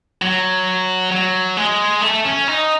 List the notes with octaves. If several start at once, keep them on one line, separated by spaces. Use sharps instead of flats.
F#3
F#3
G#3
A3
C#4
D#4